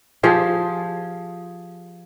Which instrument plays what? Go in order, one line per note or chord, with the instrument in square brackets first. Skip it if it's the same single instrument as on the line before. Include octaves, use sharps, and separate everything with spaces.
[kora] F3 G4 G#4